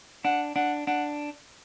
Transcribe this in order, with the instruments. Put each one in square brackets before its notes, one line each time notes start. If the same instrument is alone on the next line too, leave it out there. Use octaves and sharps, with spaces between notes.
[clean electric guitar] D4 [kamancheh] F#5
[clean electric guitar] D4 [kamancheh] F#5
[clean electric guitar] D4 [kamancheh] F#5